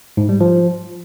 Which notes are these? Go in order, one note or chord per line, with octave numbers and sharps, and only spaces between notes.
G#2
G3
F3